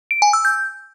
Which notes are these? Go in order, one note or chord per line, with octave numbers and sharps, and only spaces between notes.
D7
G#5
E6
G6